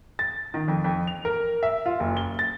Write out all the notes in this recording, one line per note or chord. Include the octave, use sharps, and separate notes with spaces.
A6
D#3
F2
F2
F7
A#4
E5
F4
F#1
G7
A6